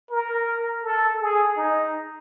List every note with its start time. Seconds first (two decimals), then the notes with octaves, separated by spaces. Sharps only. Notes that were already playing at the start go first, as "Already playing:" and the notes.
0.11 A#4
0.84 A4
1.21 G#4
1.57 D#4